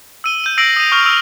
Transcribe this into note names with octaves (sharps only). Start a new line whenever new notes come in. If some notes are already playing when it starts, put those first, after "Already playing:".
E6 D#7 G7
G6 D#7
E6 A#6 C7 D7 F#7
D#6 D#7
C#6 F6 F7
E6